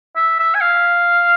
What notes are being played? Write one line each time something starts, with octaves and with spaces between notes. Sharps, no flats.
E5
E5
G#5
F5